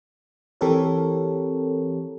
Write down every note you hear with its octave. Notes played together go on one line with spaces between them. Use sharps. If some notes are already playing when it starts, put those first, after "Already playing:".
E3 C4 G4 A4 A#4 C#5